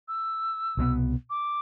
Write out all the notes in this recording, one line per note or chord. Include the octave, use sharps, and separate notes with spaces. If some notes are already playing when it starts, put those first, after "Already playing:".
E6
C2 B2 G3 B3
D6